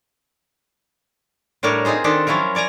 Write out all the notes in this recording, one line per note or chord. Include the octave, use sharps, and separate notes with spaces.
A2 G3 D4 A#4 C#5 D5
C4 D#4 F4 G#4 C5
D#3 D4 D#4 G4 A4 C5
F3 F#3 C#4 E4 F4 A#4
C#5 D5 G#5 A#5